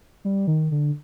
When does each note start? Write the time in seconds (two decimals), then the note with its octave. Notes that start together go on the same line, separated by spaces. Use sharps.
0.25 G3
0.47 D#3
0.71 D3